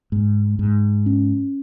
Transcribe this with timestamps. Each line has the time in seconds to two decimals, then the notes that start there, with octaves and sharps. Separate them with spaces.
0.12 G#2
0.59 G#2
1.06 C#4